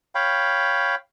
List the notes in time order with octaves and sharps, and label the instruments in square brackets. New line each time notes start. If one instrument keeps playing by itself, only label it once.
[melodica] C#5 F5 G5 B5